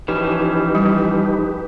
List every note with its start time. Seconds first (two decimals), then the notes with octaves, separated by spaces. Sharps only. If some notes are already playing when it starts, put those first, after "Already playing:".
0.08 E3 F3 C#4 D#4 G4 B4
0.75 G3